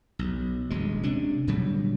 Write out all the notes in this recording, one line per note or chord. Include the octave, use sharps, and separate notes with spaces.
B1
D#1 D2 G#3
C3 C#4 D4
A#2 D3 F#3 G3